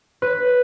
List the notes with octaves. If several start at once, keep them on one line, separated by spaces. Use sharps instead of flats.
B4